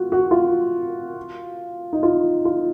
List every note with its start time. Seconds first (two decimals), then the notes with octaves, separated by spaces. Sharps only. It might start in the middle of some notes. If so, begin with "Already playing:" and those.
Already playing: F4 F#4
0.12 F#4
0.31 F4
1.93 D#4
2.03 F4
2.45 F4